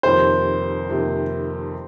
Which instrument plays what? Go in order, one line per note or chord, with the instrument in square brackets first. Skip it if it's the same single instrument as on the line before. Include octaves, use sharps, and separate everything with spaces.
[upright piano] F1 F2 C3 D#3 A#3 [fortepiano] C5
[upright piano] F1 F2 C3 D#3 A#3